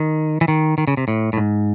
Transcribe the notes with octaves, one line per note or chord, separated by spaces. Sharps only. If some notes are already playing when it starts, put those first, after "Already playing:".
Already playing: D#3
E3
D#3
D#3
C#3
C3
A2
A2
G#2